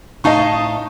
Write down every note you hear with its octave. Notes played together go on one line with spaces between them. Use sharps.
A2 D#4 D#5 F5 A5 C#6